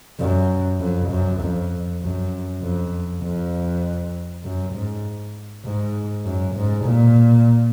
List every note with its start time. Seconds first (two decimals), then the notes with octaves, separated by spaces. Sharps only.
0.19 F#2
0.80 F2
1.10 F#2
1.40 F2
2.01 F#2
2.62 F2
3.22 F2
4.44 F#2
4.74 G#2
5.65 G#2
6.25 F#2
6.55 G#2
6.85 A#2